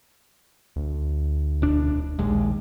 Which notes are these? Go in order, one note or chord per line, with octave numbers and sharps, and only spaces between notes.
D2
E1 D4
A#1 D#2 G#3